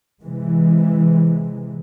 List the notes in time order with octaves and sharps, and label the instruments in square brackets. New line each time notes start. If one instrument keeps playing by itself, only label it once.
[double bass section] C3 E3 G#3